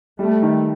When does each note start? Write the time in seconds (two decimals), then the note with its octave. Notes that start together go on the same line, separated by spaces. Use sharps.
0.19 G3 A3
0.42 D#3